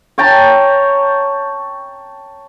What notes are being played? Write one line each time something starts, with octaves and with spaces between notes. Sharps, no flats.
C#5 G5 A5 A#5